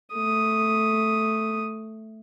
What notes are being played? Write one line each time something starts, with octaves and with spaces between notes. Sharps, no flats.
A3 D#6